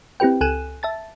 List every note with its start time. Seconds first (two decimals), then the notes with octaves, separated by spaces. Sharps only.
0.20 C4 E4 G4 B4 G5
0.41 C#2 A4 G#5 F#6 D#7 E7
0.83 E5 A5 A6